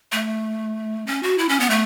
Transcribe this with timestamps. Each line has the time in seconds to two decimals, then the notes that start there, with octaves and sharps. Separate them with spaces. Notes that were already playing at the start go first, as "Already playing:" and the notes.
0.12 A3
1.07 C#4
1.23 F#4
1.38 E4
1.49 C#4
1.60 B3
1.70 A3